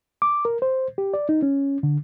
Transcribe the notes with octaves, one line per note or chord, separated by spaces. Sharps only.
D6
A#4
C5
G4
D5
D#4
C#4
D3